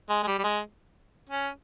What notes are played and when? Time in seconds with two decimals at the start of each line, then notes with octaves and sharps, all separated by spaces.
0.09 G#3
0.23 G#3
0.27 G3
0.38 G3
0.44 G#3
1.30 C#4